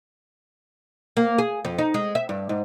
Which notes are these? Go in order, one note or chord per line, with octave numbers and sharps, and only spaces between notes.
A#3
G#4
F2
D#4
G#3
E5
G2
G#2